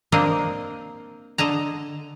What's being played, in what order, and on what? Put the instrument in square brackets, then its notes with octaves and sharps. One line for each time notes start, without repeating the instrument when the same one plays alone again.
[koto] A#3 C4 D4 A#4 D#5
D3 D#5 A5 A#5